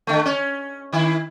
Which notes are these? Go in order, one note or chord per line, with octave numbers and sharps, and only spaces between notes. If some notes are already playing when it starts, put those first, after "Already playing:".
D3 A3
C#4
D#3 E4